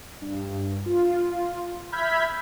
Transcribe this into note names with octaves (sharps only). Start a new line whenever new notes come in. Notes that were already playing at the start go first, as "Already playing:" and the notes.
G2
F4
E5 B5 F6 G6 G#6 B6